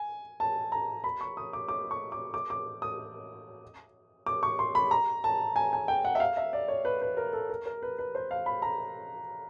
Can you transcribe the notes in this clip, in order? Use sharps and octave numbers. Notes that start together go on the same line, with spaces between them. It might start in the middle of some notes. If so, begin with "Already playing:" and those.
Already playing: G#5
A5
A#5
B5
C#6
D#6
D6
D6
C#6
D6
D6
D6
D#6
D6
C#6
C6
B5
A#5
A5
G#5
G#5
G5
F#5
E5
F5
E5
D5
C#5
B4
B4
A#4
A4
A#4
A#4
B4
B4
C5
F5
B5
A#5